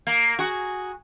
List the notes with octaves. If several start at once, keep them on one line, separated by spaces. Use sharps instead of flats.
A#3
F#4 G#4